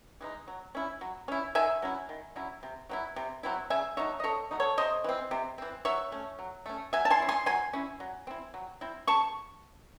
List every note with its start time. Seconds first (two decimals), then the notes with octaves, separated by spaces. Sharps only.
0.21 E3 G#3 D#4
0.48 F#3
0.75 C#4 E4
1.01 F#3
1.28 C#4 E4
1.55 D#3 E5 G#5
1.82 F#3 C#4 E4
2.09 D#3
2.36 F#3 C#4 E4
2.63 C3
2.89 F#3 C4 E4
3.16 C3
3.43 F#3 C4 E4
3.70 C#3 E5 G#5
3.97 F#3 A3 D#4 C#5 E5
4.20 D#5
4.24 C#3 A4 C#5
4.51 F#3 A3 D#4
4.60 A4 C#5
4.77 C3 C5 D#5
5.04 E3 C4
5.31 C3
5.58 E3 C4
5.85 F#3 C#5 E5
6.12 A3 C#4
6.39 F#3
6.66 A3 C#4
6.93 F#3 E5 G#5
7.05 A5
7.10 G#5 C6
7.20 C#4 E4
7.29 G#5 C6
7.46 F#3 G#5 C6
7.73 C#4 E4
8.00 F#3
8.27 C4 E4
8.54 F#3
8.81 C4 E4
9.07 C#3 A5 C#6